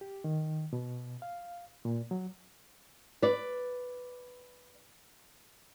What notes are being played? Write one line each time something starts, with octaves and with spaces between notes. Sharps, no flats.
G4
D#3
B2
F5
A#2
F#3
B4 D5